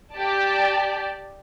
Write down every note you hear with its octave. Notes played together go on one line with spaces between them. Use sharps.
G4 D5 A5